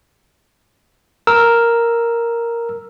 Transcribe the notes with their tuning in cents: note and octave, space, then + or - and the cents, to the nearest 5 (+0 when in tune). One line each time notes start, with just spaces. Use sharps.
A#4 +0 E6 +0